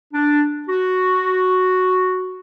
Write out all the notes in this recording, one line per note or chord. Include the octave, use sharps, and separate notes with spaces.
D4
F#4